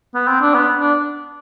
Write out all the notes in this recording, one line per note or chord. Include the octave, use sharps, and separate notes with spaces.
B3
C4
D4
B3
D4